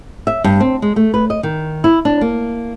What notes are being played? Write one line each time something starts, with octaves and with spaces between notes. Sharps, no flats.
E5
G2
C4
G#3
A3
B4
D#5
D#3
E4
D4
A#3